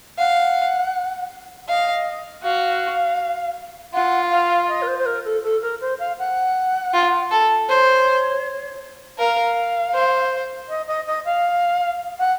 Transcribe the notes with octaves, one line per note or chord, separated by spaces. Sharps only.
F5 F#5
D#5 F5
F#4 F5
F4 F#5
F5
D#5
A#4
C5
C5
A#4
A4
A4
A#4
C5
F5
F#5
F4
A4
C5 C#5
A#4 F5
C5
D#5
D#5
D#5
F5
F#5